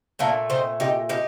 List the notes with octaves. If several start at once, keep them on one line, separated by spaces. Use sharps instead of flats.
A#2 A3 A#3 D4
C4 D#4
D#4 G4
D#4 G4